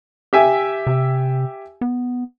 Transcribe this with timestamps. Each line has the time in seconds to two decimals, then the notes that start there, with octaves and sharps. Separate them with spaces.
0.33 G4 E5 G#5
0.87 C3
1.81 B3